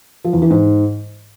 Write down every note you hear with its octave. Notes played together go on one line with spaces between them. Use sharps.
F3
E2
E3
G#2